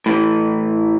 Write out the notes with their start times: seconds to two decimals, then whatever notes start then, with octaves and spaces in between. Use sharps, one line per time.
0.06 A2 E3